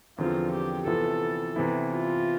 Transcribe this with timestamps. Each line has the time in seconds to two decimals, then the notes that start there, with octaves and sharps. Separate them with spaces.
0.18 E2 D3 F3 C4 F4
0.52 G4
0.87 C3 E3 B3 F4 A4
1.56 C3 E3 B3 E4
1.91 F4